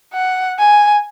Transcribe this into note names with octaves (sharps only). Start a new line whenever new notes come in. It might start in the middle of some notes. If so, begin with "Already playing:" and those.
F#5
G#5